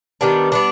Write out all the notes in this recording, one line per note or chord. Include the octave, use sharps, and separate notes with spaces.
D#3 G3 B3 D4
G3 B3 D4